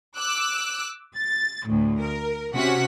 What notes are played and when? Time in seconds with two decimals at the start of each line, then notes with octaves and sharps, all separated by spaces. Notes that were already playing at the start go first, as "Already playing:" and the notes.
0.17 D6 E6 F#6
1.16 A6
1.67 D2 A2
2.01 A#4
2.55 C3 C#4 F#4 F#5 B6